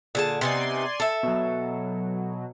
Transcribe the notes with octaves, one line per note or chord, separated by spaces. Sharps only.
A#2 D3 G#4 A5
C3 B3 D#4 D5 G#5 C6
A4 E5
B2 F#3